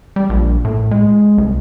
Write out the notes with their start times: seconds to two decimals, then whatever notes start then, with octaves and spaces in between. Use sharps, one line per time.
0.16 G3
0.29 A#1
0.65 A2
0.91 G#3
1.38 C2